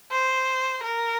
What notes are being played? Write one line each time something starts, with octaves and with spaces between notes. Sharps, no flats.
C5
A#4